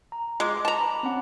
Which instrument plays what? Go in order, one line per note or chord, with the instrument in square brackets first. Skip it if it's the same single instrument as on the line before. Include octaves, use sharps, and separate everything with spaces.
[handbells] A#5
[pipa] G#3 [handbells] F4 D#5 D6
[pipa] A5 A#5
[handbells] B5 D6
C4 C#4 F#5